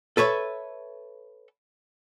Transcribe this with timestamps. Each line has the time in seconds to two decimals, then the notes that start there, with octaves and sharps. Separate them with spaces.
0.17 A4 B4 C#5 E5